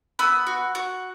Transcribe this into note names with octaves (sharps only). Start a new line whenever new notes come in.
B3 B5 E6
F#4
F#4